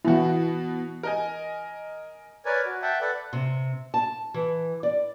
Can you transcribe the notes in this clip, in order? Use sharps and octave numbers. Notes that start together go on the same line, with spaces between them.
B2 E3 E4 F#4
A#4 D#5 G#5
A#4 B4 C#5 D5 G#5
F#4
E5 F#5 G5 A5
A4 B4 D5 F#5
C3
A5
E3
D5